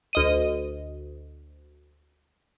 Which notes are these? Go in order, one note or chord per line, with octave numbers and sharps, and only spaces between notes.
D2 D#5 D#7